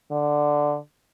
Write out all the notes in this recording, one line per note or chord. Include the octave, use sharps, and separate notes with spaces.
D3